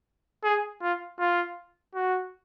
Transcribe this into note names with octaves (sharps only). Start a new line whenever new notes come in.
G#4
F4
F4
F#4